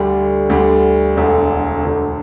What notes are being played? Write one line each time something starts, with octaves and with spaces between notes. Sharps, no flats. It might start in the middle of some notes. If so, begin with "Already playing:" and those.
Already playing: D2 D3 G3
D2 D3 G3
E1 D2 D3
E1 D2 D3